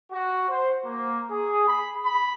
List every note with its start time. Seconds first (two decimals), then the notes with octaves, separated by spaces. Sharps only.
0.11 F#4
0.49 C5
0.86 A#3
1.30 G#4
1.68 B5
2.04 B5